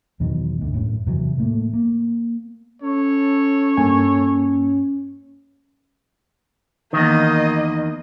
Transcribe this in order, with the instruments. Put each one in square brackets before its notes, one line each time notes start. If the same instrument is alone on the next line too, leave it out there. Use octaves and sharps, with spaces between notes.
[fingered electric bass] E2 B2 D#3 F#3
D2 G#2
F#2 A2
E2 C3 E3 F#3
A2 A3 A#3
A#3
[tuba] C#4 [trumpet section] A4 C#5
[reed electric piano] G2 A#3 G#5
[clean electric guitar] E2 D#3 [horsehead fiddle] A#3 D#5